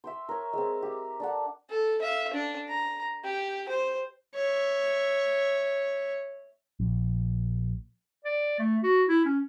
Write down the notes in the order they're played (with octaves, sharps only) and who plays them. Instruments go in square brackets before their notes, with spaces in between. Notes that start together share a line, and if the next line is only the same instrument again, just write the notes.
[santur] E5 G5 C6
A#4 C#5
G#3 C4
G4
D4 A4 F#5
[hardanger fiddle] A4
E5 F5
D4
A#5
G4
C5
[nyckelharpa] C#5 E5
[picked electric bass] A#1
[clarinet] D5
A3
F#4
E4
C#4